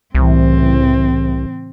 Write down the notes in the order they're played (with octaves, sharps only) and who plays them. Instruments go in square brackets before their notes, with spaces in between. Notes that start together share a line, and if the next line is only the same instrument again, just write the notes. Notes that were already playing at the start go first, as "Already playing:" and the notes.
[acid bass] C2 [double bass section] A2 C#3 E3 [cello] C4